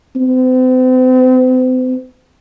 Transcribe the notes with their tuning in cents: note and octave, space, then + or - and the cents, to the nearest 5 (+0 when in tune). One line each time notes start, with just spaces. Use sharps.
C4 -40